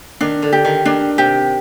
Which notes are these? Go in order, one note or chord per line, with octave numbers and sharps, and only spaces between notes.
D#3 D4
D3
G4
D#3
D#3 D4
C3 G4